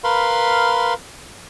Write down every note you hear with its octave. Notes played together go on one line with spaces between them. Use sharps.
A#4 B4 F5 B5 C6